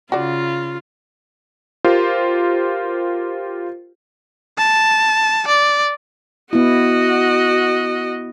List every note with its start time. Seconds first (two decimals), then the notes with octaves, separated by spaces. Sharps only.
0.12 C#3 F4 F#4 D5
1.85 F4 G4 A#4 C5
4.58 A5
5.48 D5
6.53 B3 E4 F#4 D#5